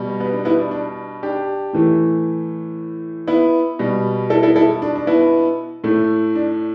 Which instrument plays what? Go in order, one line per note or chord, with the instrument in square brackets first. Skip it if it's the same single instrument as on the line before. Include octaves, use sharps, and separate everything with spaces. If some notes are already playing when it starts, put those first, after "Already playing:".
Already playing: [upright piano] B2 G3
B3
D4
B3 E4
D4
D4
D4 G4
A2 E3 A3
B3 E4
B2 G3
E4 A4
E4 A4
E4 A4
D4
D4
B3 E4
A2 A3
D4